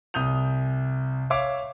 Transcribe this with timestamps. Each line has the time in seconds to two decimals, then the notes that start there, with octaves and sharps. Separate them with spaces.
0.14 C2 D#6 G6 F7
1.30 C#5 E5 F5 D6